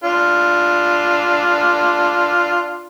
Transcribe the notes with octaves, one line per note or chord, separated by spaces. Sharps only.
D4 F4